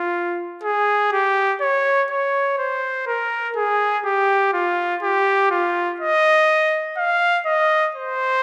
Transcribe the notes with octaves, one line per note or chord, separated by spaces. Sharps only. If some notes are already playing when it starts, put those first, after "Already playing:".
Already playing: F4
G#4
G4
C#5
C#5
C5
A#4
G#4
G4
F4
G4
F4
D#5
F5
D#5
C5